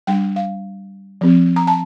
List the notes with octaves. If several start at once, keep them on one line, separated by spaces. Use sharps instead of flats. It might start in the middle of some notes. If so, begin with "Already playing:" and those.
G3 D4 G5
F5
F3 C4
A#5
A5